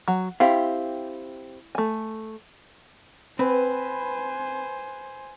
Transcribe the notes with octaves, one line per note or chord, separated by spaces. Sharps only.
F#3
C4 E4 G4 F5
A3 G#5
C4 B4 C5 G#5